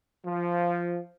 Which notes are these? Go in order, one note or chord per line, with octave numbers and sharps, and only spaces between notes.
F3